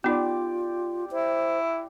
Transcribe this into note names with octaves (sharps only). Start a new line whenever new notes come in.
B3 D#4 F4 G4 D5
E4 C5